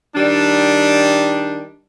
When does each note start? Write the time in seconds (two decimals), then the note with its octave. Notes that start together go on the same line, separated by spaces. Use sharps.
0.15 D#3 G3 D4